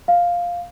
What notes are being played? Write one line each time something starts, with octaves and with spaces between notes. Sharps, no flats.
F5